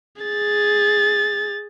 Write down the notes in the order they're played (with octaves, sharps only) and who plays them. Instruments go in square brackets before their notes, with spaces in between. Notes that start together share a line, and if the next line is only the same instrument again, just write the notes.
[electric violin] G#4 A6